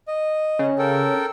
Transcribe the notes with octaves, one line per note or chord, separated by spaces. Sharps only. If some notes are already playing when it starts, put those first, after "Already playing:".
D#5
C#3
A4 A#4 G5